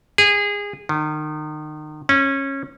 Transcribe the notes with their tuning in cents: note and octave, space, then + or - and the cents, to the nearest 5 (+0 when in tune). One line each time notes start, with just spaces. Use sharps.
G#4 -25
D#3 -30
C#4 -20